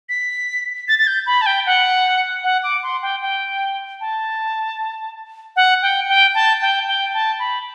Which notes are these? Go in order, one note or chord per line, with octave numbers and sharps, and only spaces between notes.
B6
A6
A6
G6
B5
A5
G5
F#5
F#5
D6
C6
G5
G5
A5
F#5
G5
G5
A5
G5
G5
A5
B5